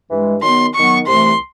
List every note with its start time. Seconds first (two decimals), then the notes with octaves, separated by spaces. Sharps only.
0.09 G2 E3 G#3
0.42 D#3 F#3 B3 C6
0.74 D#3 F#3 B3 C#6
1.07 C2 C3 E3 A3 C6